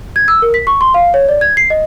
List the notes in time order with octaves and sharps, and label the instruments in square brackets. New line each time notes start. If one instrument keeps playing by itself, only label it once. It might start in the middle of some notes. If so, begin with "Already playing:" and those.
[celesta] G#6
E6
A#4
B6
C#6
C6
F5
C#5
D5
G#6
C7
D#5